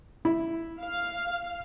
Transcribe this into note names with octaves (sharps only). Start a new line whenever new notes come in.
E4
F5